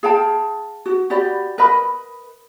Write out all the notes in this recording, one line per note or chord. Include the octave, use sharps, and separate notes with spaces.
G#4 F5 G5 A5
F#4
F#4 G4 D5 B5
A#4 B4 D#5 B5